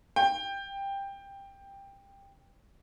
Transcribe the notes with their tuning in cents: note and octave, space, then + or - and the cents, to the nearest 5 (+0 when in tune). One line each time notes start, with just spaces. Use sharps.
G5 +10